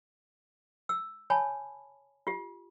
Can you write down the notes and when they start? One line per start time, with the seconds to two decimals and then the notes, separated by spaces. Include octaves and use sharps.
0.89 E6
1.30 C#5 G#5 A5 B5
2.27 F4 G4